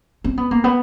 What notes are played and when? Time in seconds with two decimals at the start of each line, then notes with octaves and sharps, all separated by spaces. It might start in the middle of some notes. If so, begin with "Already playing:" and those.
0.24 C4
0.37 B3
0.51 A#3
0.64 B3